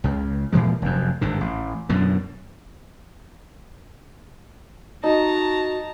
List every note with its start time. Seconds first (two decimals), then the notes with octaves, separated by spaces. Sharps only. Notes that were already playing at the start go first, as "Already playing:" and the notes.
0.04 C#2 C#3
0.52 A#2 E3 F3 G#3
0.82 F1 F#2
1.21 G#1 G2 D3
1.41 A1
1.89 F#2 B2 D3
5.04 D#4 F#4 A5 A#5